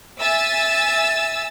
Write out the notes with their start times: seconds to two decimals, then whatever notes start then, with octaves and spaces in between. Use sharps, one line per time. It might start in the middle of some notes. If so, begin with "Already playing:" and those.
0.20 E5 G#5 E6 A6